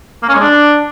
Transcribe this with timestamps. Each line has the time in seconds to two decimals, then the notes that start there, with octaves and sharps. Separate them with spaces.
0.22 A#3
0.28 C#4
0.34 G#3
0.40 D4